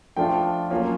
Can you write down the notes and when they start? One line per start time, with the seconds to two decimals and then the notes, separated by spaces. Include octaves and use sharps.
0.17 F3 A3 D4 F4 G5
0.71 F#3 A#3 C#4 F4